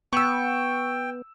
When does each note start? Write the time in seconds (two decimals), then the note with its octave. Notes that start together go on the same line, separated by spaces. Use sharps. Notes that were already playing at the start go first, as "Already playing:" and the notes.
0.13 B3 G5 C#6 E6